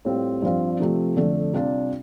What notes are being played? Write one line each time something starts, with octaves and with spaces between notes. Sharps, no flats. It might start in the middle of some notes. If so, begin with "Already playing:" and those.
A2 G3 C4 F4
G2 F3 C4 F4
C3 F3 A3
F2 D3 A3
C3 G3 D4 F4